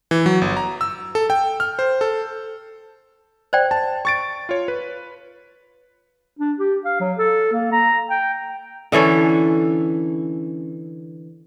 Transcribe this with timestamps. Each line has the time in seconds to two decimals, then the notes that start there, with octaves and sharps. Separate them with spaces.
0.11 E3
0.26 F#3
0.42 G1
0.57 A#5
0.81 E6
1.15 A4
1.30 G5
1.60 F6
1.79 C5
2.01 A4
3.53 C5 D5 G5
3.71 A5
4.05 C#6 A6 D7
4.49 F4 C#5
4.68 B4
6.39 D4
6.59 G4
6.85 F5
7.00 F#3
7.18 A4
7.52 A#3
7.72 A#5
8.10 G5
8.92 D3 E3 C#4 A4